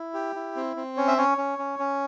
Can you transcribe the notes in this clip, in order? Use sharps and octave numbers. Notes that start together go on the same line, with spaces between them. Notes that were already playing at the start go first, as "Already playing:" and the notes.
Already playing: E4
G4
E4
C4
C4
C#4 C#5
E5
C#4 C#5
C#4
C#4
C#4